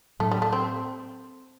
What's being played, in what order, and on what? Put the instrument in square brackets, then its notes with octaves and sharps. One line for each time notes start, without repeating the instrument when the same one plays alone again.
[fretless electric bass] A2 F#3 A#3 D4 [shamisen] A3
[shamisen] G3
A3
C4